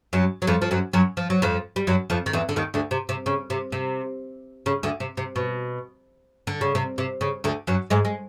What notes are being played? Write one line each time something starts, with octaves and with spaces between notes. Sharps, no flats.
F#2 F#3
F#3
F2 F3
F3
F#2 F#3
F#2 F#3
F3
F#3
F2 F3
G3
F#2 F#3
F2 F3
D#3
E2 E3
D3
D#2 D#3
D2 D3
C3
C3
C#3
C3
C3
C#3
D2 D3
C3
C3
B2
D3
C#3
C3
C3
C#3
D2 D3
F#2 F#3
G#2 G#3
G#3